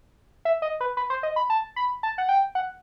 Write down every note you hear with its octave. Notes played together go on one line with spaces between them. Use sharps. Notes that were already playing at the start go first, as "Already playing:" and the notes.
E5
D#5
B4
B4
C5
D#5
B5
A5
B5
A5
F#5
G5
F#5